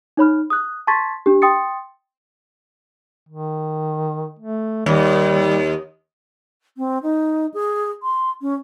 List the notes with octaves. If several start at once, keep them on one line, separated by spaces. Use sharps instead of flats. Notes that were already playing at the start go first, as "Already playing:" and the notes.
D#4 C#5 B5 F6
D#6 F#6
A5 C6 C#6 G#6 A6 B6
D4 G4
G5 C6 D#6 A6 C#7
D#3
A3
D#2 G3
C4
D#4
G#4
C6
C#4